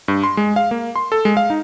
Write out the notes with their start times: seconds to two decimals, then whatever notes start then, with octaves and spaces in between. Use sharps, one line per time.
0.08 G2
0.24 C6
0.37 G#3
0.56 F5
0.71 A#3
0.96 C6
1.12 A4
1.25 G#3
1.37 F5
1.50 D#4